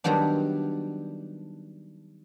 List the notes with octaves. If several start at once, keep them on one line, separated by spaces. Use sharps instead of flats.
D#3 F#3 G3 B3 D4